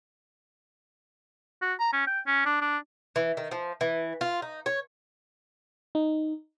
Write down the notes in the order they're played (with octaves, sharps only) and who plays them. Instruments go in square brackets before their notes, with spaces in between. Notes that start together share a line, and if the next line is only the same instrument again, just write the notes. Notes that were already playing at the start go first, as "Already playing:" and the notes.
[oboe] F#4
A#5
C#4
G5
C#4
D4
D4
[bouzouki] E3
D#3
F3
E3
F4
D#4
C#5
[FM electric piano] D#4